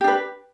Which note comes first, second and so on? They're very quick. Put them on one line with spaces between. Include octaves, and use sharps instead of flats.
G4 D4 B4